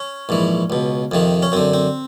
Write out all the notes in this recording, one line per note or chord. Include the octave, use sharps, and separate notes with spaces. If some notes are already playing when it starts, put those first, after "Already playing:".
Already playing: C#4
A#1 G#2 E3
C#2 B2
F2 C3 D#3
C#4
F#2 D3 C4
C4